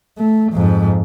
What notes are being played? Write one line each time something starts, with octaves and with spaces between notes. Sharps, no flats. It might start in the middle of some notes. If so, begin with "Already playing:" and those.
A3
F2 G#2